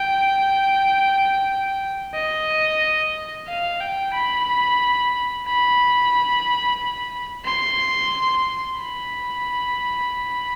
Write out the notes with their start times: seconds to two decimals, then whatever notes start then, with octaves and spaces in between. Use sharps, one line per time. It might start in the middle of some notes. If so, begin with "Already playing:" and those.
Already playing: G5
2.14 D#5
3.47 F5
3.81 G5
4.14 B5
5.47 B5
7.45 C6
8.78 B5